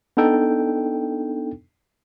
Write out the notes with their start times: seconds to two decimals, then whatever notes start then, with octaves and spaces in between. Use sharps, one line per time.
0.17 B3 D4 D#4 A4 G5